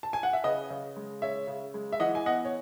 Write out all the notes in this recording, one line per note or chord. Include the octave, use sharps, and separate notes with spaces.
A5
G#5
F#5
E5
C#3 B4 D#5
C#3
G#3
C#3 C#5 E5
C#3
G#3
E5
E3 D#5 F#5
G#5
B3 D#5 F#5
C#5